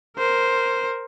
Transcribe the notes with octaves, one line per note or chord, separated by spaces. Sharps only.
A#4 C5